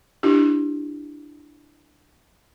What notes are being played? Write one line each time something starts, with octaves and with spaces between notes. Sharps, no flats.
D4 E4 G4